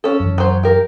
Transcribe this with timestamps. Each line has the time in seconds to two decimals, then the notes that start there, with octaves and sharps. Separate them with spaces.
0.04 C#4 A4
0.20 F#2 E3
0.38 F#3 C5
0.63 G4 A#4